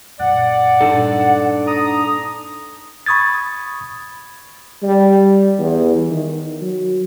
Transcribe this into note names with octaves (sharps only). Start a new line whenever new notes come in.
F#2 A#2 D5 F#5
G2 A#2 D4 D#4 A4
A#5 D#6
B5 C#6 D#6 G#6 A6
G3
E2
D#3
F#3